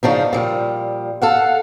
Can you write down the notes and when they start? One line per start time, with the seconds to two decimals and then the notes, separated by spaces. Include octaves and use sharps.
0.03 C#3 F3 D4 D#4
0.33 A#2 F3 G3
1.22 A4 F5 F#5